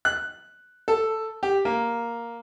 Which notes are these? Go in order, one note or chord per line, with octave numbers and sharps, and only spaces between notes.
F#6
A4
G4
A#3